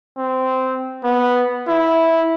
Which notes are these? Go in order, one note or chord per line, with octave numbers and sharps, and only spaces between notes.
C4
B3
E4